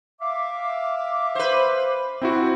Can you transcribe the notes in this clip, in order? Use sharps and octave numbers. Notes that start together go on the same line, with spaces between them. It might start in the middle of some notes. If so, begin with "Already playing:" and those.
E5 F5 D6
B4 C5
C3 C4 E4 F#4